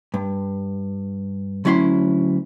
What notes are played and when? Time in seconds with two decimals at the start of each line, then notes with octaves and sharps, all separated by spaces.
0.14 G2
1.65 D2 F#3 C#4 E4 E5 C6